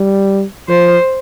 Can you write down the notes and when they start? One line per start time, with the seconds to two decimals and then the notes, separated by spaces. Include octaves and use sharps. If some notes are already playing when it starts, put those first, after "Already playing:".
Already playing: G3
0.69 F3 C5